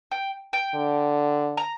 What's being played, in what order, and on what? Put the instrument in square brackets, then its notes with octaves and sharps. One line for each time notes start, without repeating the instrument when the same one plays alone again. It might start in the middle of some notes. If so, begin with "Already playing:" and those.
[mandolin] G5
G5
[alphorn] D3
[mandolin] A#5